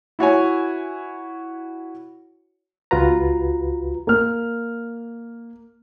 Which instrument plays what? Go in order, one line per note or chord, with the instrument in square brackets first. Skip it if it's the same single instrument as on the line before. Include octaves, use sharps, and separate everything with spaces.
[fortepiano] E4 F#4 C#5 G#5
[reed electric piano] C#2 F4 F#4 B4 A#5
[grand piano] A#3 F6